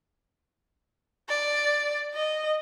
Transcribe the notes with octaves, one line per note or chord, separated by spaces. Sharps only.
D5
D#5